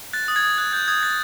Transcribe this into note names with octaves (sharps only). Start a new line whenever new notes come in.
F#6 A6
D#6 A6
G#6
D#6
F#6 G#6
F#6 G6
D#6 G#6
F#6 A6